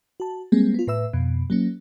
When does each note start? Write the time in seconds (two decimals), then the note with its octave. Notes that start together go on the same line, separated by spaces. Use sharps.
0.20 F#4 A5
0.52 G3 G#3 A#3 C4 G#4
0.74 B3 F4
0.87 A2 B4 E5 E6
1.13 F2 B2
1.50 F#3 A#3 C#4